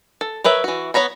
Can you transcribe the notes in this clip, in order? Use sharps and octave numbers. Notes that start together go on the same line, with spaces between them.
A4
A#4 B4 C#5 E5
E3 F#4
B3 C#5 A#5 B5